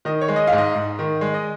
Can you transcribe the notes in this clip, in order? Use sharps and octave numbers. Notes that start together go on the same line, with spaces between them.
D#3 D#5
C#5
G#3
D#5
F5
G#2
D#5
G#2
D#3
G#3
D#5